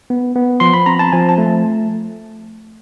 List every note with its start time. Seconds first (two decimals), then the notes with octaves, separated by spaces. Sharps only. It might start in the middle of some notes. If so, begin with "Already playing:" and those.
0.10 B3
0.36 B3
0.60 F3 C6
0.74 B5
0.86 C4 A#5
0.99 A5
1.12 F3 G#5
1.29 A5
1.38 A3